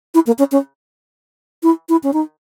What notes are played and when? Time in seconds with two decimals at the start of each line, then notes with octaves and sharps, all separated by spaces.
0.14 E4
0.27 A#3
0.39 C#4
0.52 C#4
1.63 E4
1.89 E4
2.03 C#4
2.13 D#4